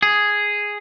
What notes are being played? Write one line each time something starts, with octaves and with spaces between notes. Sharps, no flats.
G#4